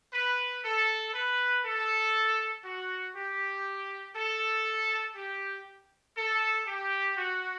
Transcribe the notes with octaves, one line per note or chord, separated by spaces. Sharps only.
B4
A4
B4
A4
F#4
G4
A4
G4
A4
G4
F#4